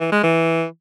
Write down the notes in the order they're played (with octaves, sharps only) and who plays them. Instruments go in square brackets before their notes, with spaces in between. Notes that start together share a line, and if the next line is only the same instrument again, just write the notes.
[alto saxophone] E3
G#3
E3